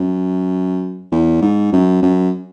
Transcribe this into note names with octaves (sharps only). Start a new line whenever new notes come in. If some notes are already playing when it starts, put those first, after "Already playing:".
Already playing: F#2
E2
G#2
F#2
F#2